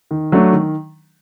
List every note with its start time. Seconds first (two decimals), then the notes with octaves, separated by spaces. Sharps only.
0.11 D#3
0.32 F#3 A3 D4
0.53 D#3